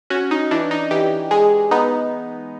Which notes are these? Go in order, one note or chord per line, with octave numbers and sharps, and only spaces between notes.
C#4 F#4
D#4
E3 D4
D#4
E3 G4
G#3 G#4
B3 D#4